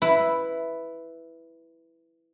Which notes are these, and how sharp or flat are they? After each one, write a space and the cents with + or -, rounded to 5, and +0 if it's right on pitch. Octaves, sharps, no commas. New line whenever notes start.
E4 +0 B4 +5